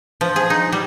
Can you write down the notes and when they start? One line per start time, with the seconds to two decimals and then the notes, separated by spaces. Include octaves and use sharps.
0.21 F3
0.36 G#4
0.50 D#4
0.72 G3